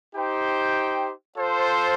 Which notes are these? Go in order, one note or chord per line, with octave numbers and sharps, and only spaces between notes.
D#4 G4 C5 G5
F4 A4 C5